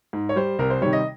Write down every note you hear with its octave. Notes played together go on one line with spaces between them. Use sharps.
G#2
C#5
G3 C5
C2 A#4
C5
C3 D#3 G3 C#5
D#5